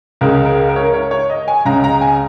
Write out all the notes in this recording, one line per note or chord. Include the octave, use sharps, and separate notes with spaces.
C#2 C#3 G#3 A#4
A#4
A#4
C#5
A#4
C#5
C#5
D#5
G#5
C#2 C#3 G#3 A#5
A#5
G#5